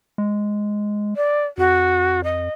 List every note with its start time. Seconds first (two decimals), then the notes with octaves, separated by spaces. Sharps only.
0.18 G#3
1.16 D5
1.58 F2 F#4
2.24 D#5